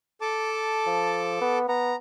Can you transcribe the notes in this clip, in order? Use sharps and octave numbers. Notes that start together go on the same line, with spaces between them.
A4 A5 D6
F3
B3
B3 A#5